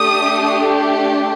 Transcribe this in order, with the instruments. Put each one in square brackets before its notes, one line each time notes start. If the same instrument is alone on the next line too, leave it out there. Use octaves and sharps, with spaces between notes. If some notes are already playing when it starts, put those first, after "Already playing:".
Already playing: [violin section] A3 D4 G4 D#6